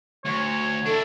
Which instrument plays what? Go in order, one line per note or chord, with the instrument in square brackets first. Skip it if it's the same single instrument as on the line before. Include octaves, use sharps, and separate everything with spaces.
[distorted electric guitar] D2 [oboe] C#5
[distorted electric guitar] D4 E4 [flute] A4